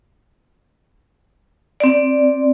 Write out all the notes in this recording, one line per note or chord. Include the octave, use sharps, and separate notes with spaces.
C4 D5